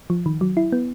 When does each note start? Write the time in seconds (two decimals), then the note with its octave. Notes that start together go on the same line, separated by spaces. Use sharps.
0.10 F3
0.26 D#3
0.41 F#3
0.57 E4
0.72 B3